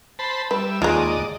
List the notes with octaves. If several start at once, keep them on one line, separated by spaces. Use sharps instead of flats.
C5 A5 B5
G3 B4 E5
D#2 G#3 F4 D5 D#5 G#5 A#5